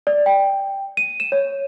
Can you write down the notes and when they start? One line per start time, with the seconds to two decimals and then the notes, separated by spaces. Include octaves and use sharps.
0.07 D5
0.26 G5
0.97 D#7
1.20 E7
1.32 C#5